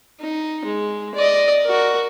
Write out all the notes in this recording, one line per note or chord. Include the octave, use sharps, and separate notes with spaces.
D#4
G#3
D5 D#5
F#4 A#4